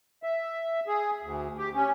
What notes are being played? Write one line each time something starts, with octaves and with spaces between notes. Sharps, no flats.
E5
G#4
D2
G4
C#4